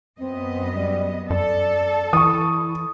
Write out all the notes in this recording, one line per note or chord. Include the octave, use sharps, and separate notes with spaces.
F#2 B3 C4 D#5
G3
F#2 A4 D5
E3 E4 C#6 D#6